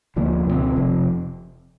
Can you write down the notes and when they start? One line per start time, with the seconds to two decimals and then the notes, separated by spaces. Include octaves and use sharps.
0.16 D2 D3 F3 A#3
0.46 C#2 B2 G3 C4
0.76 F1 F2 C3 F3